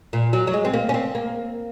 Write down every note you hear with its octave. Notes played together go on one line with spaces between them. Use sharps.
A#2
F#3
F#3
G#3
C4
A#3
C#4
C4
A#3